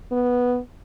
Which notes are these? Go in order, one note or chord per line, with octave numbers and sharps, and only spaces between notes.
B3